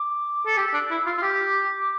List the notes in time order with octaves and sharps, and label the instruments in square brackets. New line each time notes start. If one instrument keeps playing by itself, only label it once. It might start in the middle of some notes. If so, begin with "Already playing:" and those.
Already playing: [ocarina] D6
[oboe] A4
[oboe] G4 [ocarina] E6
[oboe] D4
E4
F4
[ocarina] E6
[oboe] F4
[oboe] G4 [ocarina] D6